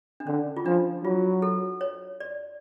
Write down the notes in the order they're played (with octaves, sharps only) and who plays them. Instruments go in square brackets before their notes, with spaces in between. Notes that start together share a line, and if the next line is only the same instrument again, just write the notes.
[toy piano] D4
[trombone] D3 [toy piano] C#4
[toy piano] F4
[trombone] F3 [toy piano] D4
[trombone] F#3 [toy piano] F4
[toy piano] A4
C#5
D5